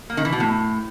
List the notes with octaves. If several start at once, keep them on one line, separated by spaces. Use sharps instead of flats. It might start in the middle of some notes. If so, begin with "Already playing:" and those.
A#3
D#3
E3
B2
A2